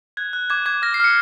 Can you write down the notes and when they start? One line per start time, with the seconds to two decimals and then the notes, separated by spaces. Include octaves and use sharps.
0.17 F#6 G#6
0.33 F#6
0.50 D6 G#6
0.66 D6 G#6
0.82 F6 A#6
0.94 C7
1.00 F6 C#7